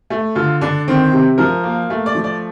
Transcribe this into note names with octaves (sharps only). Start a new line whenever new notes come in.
A3
D3 F4
D3 D4
D#3 C4
C3
F3 A#4
A#3
A3
D5
F3
D5